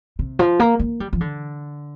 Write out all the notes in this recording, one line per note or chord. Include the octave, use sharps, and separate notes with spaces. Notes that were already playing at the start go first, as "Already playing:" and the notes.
C3
F3
A#3
A#3
G3
F3
D3